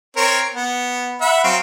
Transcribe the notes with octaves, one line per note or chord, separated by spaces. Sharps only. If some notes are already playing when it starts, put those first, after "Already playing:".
C4 A#4 C#5
B3
E5 F#5 B5
F#3 C4 F5